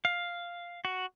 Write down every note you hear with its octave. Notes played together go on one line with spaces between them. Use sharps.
F5
F#4